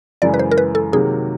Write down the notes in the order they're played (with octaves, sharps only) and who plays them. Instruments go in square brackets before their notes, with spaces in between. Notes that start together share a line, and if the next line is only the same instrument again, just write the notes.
[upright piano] F#2 C#3 E3 G#3 [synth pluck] D5
[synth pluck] B4
C5
A#4
B4
A4
[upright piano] C3 D#3 F#3 A#3 [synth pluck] G#4